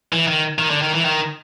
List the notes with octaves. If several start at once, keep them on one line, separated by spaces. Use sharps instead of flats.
E3
D#3
D#3
D3
D#3
E3
D#3